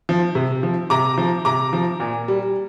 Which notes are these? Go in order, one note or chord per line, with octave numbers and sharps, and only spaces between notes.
F3
C3
F3
C3 A#5 D6
F3
C3 A#5 D6
F3
A#2
G3